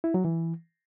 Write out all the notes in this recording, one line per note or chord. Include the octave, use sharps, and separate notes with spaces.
E4
F#3
E3